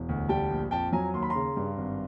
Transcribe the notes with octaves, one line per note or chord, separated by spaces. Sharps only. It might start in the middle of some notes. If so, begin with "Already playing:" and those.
Already playing: E1
D2
G3 G5 A5
A#1
F2 G5 A5
F#3 G#5 A#5
D#2 C6
B5
A#5 C6
C#3
G2
G#1